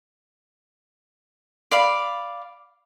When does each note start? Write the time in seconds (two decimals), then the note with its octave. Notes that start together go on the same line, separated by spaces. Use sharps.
1.71 D5 F5 B5